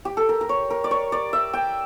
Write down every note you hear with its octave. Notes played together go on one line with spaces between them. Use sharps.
G4
A4
A#4
A#4
C#5
A#4
D5
C#5
D5
E5
G5